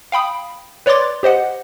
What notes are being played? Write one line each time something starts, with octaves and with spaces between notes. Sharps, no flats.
F5 G5 B5 D#6
B4 C#5 D5 C6 D6 A6
G4 C5 D#5 F#5